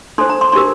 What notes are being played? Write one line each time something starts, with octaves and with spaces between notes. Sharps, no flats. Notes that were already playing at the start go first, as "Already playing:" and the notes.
D4 A4 C5 C6
A#5
C6
D4 G4 A#4 C6